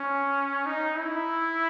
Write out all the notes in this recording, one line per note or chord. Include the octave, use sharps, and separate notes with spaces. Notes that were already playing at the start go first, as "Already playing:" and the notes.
Already playing: C#4
D#4
E4